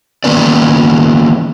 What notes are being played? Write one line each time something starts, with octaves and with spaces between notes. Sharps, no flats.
D#3 E3 A#3 B3 C#4 D5